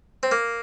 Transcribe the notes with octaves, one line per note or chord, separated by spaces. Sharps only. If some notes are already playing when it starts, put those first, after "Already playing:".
C4
A#3